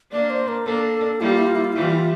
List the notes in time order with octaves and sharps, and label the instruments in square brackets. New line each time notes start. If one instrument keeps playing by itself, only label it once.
[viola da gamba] A#3 D4 [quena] D5
[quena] C5
A#4
[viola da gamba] A#3 D4 [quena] A4
[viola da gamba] G3 A#3 [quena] E4
[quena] F4
E4
F4
E4
F4
[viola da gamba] E3 G3 [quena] E4
[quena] F4
E4
F4